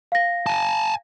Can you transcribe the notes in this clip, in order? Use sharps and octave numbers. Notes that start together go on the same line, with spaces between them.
F5 A#6
G#5 A5